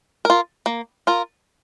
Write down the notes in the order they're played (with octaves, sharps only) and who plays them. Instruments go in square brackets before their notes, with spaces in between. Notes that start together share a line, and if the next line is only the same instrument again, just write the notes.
[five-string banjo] F4 A#4
A#3
F4 A#4